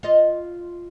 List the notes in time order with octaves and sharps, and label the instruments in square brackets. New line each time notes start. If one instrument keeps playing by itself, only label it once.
[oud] F4 D#5